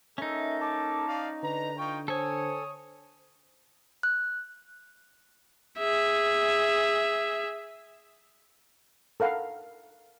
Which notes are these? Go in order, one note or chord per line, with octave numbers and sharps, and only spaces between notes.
A#3 C#4 D#4 A4 A#4 E5
A5 D6
D5 D#5 F5
D3 B4 A#5
D#4 F4 G5 C#6
A4 C5 C#5 G#5 D#6
F#6
G#4 E5
A4 A#4 F5 F#5 B5